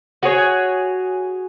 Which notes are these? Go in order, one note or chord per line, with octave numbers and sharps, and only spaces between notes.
F#4 G#4 C#5